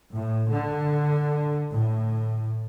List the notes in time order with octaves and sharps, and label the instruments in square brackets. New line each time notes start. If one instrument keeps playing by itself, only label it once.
[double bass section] A2
D3
A2